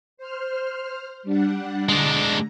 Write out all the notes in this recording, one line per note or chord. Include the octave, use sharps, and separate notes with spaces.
C5 F6
G3 D4 F#5
D3 G#3 D4 A#5